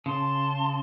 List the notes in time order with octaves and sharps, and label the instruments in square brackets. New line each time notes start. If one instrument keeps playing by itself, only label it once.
[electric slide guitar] C#3 [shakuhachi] A5 [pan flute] C6